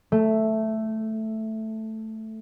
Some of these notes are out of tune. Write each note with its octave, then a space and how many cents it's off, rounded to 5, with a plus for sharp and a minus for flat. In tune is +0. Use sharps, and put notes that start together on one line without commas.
A3 +0